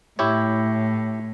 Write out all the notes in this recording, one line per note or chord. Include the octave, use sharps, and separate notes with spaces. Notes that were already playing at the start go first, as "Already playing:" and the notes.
A2 E4 G4 C#5